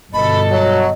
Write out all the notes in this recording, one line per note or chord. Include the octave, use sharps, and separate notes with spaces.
G1 B2 A4 D#5 B5
F#3 F#4